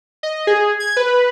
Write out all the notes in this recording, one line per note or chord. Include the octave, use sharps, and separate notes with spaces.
D#5
G#4
G#6
B4